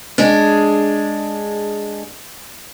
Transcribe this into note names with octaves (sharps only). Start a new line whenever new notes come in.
G#3 D4 G#4